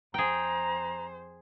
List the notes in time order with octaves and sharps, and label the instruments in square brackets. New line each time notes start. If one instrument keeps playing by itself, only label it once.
[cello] F2 C5 [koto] G#4 G5 [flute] A#5